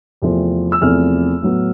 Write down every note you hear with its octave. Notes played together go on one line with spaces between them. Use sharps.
E2 C3 F3 A3 C4
E6
E2 C3 F3 A3 C4 F6
A2 F#3 B3